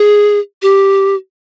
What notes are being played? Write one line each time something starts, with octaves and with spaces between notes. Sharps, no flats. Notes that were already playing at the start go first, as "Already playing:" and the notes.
Already playing: G#4
G4